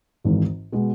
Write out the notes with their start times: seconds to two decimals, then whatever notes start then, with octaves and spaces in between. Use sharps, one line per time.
0.24 G#1 G#2 E3
0.72 B2 G#3 B3